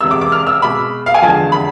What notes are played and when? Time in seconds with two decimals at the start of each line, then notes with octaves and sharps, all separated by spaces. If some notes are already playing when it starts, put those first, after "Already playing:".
0.01 E2 C3 G#3 E6
0.11 D6
0.21 D6
0.32 F6
0.47 E6
0.62 B2 G#3 B5
1.06 F5
1.14 G#5
1.22 E2 D3 F3 G#3 A5
1.52 B5